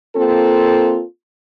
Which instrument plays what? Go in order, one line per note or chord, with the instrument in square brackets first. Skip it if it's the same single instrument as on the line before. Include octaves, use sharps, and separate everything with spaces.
[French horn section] A#3 C4 F4 A4